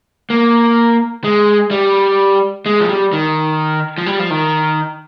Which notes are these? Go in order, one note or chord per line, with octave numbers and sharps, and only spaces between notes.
A#3
G#3
G3
G#3
F3
G3
D#3
F3
G3
F3
D#3